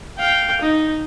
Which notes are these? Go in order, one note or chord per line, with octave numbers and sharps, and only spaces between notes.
F5 G5
D#4